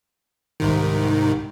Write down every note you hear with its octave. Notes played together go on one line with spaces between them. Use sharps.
C2 G#2 D#3